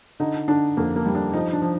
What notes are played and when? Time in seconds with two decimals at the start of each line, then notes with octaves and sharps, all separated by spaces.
0.20 D3 D#4
0.48 D3 D4
0.77 F2 A#3
0.96 A#3
1.06 G3
1.15 D4
1.33 F3 D#4
1.53 D4
1.62 F3